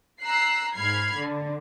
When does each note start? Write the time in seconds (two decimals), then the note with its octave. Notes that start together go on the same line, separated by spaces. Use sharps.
0.23 A#5 E6 F#6 C7
0.75 G#2 B5 F6 G#6 C7
1.17 D3